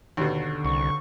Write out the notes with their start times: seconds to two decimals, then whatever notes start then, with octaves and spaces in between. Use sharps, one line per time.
0.17 D#2 B2 D3
0.65 C2 C#6